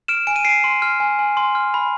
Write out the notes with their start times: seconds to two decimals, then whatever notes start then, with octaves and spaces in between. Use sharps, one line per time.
0.08 F6 D7 E7
0.27 G#5 D7
0.36 D#7
0.45 G#5 C7 D7
0.64 C6
0.82 F6
1.00 G#5
1.19 G#5
1.37 C6
1.55 F6
1.74 B5